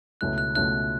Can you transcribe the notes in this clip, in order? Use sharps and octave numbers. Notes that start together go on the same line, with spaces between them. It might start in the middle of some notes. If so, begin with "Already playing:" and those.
C#2 B2 A3 C#4 E4 F#6
F#6
C#2 B2 A3 C#4 E4 F#6